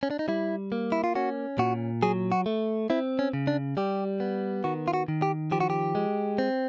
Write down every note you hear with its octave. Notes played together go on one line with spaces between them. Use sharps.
C#4
D4
D#4
G3 E4
A#3
E4
F4
C#4 F#4
A#2 F#4
F#3 G#4
F#4
A3
C4 E4
C#4
C#3
D4
G3 G4
B3
D#3 F#4
F4
F#4
D#3
G4
F3 G4
F#4
G4
G#3
C4